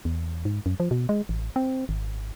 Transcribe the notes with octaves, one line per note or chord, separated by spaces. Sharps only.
E2
G#2
F#2
F3
B2
G#3
A1
C4
G#1